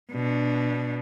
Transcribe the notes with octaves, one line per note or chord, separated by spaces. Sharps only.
B2 D4